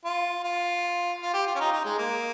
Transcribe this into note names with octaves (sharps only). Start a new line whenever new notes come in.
F4
F4
F4
G4
F4
C#4
D#4
D#4
G#3
A#3